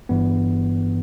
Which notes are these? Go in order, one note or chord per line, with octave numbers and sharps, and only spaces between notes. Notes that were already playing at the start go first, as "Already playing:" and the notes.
G1 G2 E3 B3